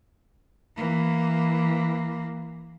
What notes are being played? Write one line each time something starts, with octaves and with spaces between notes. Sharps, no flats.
E3 A#3